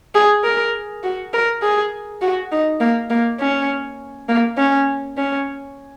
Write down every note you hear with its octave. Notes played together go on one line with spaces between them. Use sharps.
G#4
A#4
F#4
A#4
G#4
F#4
D#4
A#3
A#3
C#4
A#3
C#4
C#4